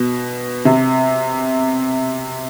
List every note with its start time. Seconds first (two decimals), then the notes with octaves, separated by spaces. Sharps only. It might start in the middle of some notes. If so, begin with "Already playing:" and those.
Already playing: B2
0.65 C3